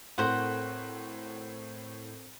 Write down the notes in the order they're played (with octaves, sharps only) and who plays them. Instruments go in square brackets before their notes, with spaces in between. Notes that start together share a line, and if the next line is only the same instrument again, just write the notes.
[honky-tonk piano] A2 [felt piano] C4 A4 A#4 [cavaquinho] F#4 C5 F#5